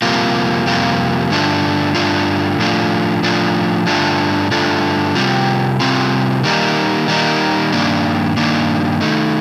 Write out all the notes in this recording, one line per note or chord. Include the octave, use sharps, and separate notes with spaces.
F2 C3 G3 A#3 F4
F2 C3 G3 A#3 F4
G2 D3 A3 D4 F4
G2 D3 A3 D4 F4
A2 F3 A3 D4 F4
A2 F3 A3 D4 F4
G2 D3 A3 D4 F4
G2 D3 A3 D4 F4
C3 G3 C4 F4
C3 G3 C4 F4
D#3 G3 A#3 D#4
D#3 G3 A#3 D#4
G2 D#3 A#3 D4
G2 D#3 A#3 D4
D#3 A3 D#4